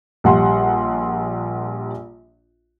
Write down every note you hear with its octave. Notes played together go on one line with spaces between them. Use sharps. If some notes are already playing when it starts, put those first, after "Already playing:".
A#1 G3 F#5 C6